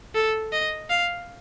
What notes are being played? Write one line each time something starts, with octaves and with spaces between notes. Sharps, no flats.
A4
D#5
F5